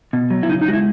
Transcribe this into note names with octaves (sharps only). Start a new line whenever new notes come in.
B2
F#3
E4
C#3 D#4
D#4
G#3 F#4
E4